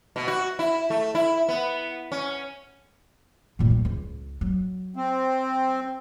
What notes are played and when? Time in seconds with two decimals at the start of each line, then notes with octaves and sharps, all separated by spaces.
0.16 B2
0.28 F#4
0.59 E4
0.90 A3
1.15 E4
1.49 B3
2.12 C#4
3.59 A#2 D#3
3.70 G3 A3
3.85 C#2
4.41 F#3
4.96 C4